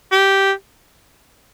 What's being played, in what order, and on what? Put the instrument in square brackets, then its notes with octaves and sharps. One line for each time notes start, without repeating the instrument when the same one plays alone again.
[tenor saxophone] G4